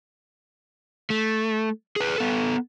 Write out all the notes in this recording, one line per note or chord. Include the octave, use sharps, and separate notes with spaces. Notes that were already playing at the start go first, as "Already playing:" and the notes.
A3
G#4 B4
B3 A4